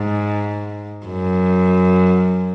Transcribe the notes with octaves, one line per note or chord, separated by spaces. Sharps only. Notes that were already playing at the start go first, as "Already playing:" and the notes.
Already playing: G#2
F#2